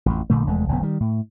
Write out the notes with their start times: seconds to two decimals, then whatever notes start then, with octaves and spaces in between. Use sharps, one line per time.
0.06 A1 F2
0.30 A#1 A#2 D3 A3
0.47 F1 E2 G#3 A3
0.68 F1 B1 D3 B3
0.83 D#3 G3
1.00 A2